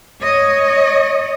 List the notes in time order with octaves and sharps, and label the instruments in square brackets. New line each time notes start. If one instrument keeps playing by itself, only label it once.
[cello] C#5 D#5